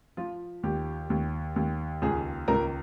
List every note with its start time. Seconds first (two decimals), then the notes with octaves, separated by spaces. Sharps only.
0.17 F3 F4
0.63 D#2 G4
1.10 D#2
1.56 D#2
2.02 C#2 G#4
2.48 C#2 A#4